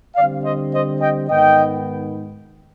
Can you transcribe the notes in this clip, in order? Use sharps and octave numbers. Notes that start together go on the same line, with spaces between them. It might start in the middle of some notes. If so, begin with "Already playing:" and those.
D3 G3 C4 D5 F5
C5 D#5
C5 D#5
D#5 G5
G#2 D#3 B3 D#5 G5